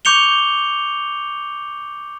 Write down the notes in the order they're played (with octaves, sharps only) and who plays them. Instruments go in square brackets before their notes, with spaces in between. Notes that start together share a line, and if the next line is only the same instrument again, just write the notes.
[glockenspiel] C#6 D6 G6 C#7 F7 G7